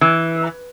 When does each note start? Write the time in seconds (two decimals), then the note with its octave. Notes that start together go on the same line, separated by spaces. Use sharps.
0.01 E3